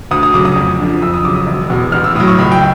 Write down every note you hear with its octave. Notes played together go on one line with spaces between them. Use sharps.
D2 D#6
D#6
C#3 F#3 D6
D#6
F2
D3 F3
F2 E6
D#6
C#3 F#3 D6
D#6
E1
E2 B2
A1 F6
E6
A2 F#3 D#6
C#6
C#2 B5
G5